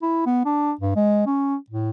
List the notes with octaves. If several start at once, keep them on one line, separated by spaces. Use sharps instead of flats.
E4
B3
D4
G2
G#3
C#4
A2